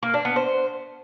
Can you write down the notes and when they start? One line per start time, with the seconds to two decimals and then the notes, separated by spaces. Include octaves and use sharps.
0.03 A#3
0.14 D4
0.25 B3
0.36 C5